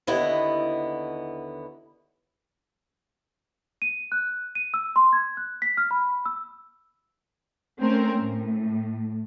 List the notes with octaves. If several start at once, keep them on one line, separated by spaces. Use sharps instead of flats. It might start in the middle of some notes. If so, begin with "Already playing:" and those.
D#2 D3 B3 E4 D#5
D#7
F#6
D#7
E6
C6
G#6
F#6
B6
F6
B5
E6
A3 C4 C#4 A#4
A2